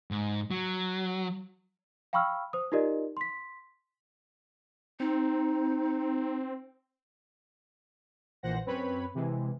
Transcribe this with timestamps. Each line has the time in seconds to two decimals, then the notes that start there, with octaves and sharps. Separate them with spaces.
0.11 G#2
0.51 F#3
2.13 F5 G5 B5 C#6 E6 F6
2.53 C5 D#6
2.72 D#4 F4 G4 A#4 D5 D#5
3.17 C6 B6
5.00 C4 D#4
8.43 A#1 A#2 E3 C5 F#5 A#6
8.65 F#2 C4 B4 C#5 B5
9.14 C3 E3 G#3